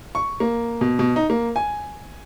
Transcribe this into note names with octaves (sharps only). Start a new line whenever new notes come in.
C#6
A#3
B2
B2
D#4
A#3
G#5